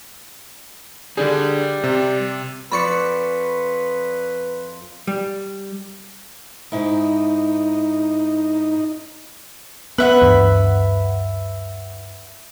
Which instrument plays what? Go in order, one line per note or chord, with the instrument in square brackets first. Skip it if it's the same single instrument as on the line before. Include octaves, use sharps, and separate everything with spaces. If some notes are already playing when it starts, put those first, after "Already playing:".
[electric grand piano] D3 D4 G#4 [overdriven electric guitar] G3
[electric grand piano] C3
[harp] F2 D5 D6 [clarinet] B4 [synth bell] B5 C#6 C#7
[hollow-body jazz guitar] G3
[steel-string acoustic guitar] G#2 E4 [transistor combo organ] D#4
[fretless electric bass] B3 [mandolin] B4 E5 F#5
[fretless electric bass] D2 G2 E3